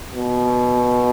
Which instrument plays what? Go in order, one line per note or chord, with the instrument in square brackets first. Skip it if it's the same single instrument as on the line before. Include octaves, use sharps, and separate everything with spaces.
[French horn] B2